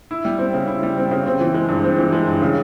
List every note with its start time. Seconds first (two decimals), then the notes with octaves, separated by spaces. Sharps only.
0.11 E4
0.25 G3
0.39 C4
0.54 C#3
0.68 E4
0.83 G3
0.98 C4
1.11 C#3
1.26 C4
1.40 E3
1.54 G#3
1.69 G2
1.84 C4
1.98 E3
2.13 G#3
2.27 G2
2.42 C#3